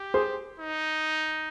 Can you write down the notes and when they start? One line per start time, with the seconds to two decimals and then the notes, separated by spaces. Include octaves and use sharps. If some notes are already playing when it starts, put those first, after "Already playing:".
Already playing: G4
0.14 G#4 C5
0.59 D#4